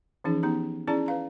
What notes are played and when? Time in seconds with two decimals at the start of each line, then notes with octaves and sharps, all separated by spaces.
0.24 E3 F3 C#4 D#4 G#4
0.43 B3 D#4 G4 A#5
0.88 C#4 E4 G#4 D5 A5 A#5
1.06 B4 F5 A#5